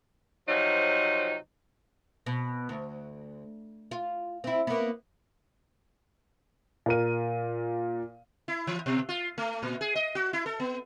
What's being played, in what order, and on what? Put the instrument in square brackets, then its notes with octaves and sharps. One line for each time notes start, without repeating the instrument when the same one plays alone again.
[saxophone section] C3 F3 F#3 D#4
[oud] B2
D2
F4
C4 E4
A#3 B3
[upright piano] A#2 A#4 D#7
[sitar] E4
E3
B2
F4
A3
A#2
G#4
D#5
F#4
E4
A4
B3